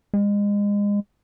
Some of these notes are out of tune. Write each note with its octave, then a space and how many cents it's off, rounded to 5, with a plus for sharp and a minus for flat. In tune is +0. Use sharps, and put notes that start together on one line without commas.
G#3 -30